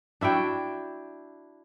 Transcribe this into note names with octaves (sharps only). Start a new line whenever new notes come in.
D4 E4 F#4 G5